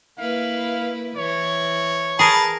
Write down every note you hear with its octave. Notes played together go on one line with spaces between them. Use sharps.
A#3 E4 B4 F5
E3 C#5
G#4 A#4 B4 A5